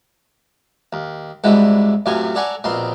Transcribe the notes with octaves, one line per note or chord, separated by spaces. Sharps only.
D#2
C2 G#2 D3 G#3 E4 F#4
F#2 A2 C3 F4 C#5 G#5
A4 C#5 D5 F#5 G#5 A#5
A#1 B2 C4 A#4 C6